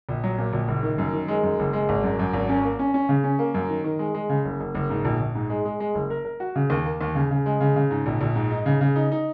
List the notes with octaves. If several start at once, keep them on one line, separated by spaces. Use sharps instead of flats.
A#1
F#3
A#2
A#1
F#1
D#3
F#2
D#3
G#3
F#2
F#1
G#3
G#1
F#2
F#2
G#1
C#4
A#3
C#4
C#4
C#3
C#4
A#3
F#2
D#3
D#3
G#3
G#3
C#3
F#1
F#1
F#1
G#2
A#1
A#1
G#2
G#3
G#3
G#3
F#1
A#4
A#4
F#4
C#3
D#2
A#3
D#2
C#3
C#3
G#3
C#3
C#3
G#2
A#1
A#1
G#2
D#4
C#3
C#3
D#4
D#4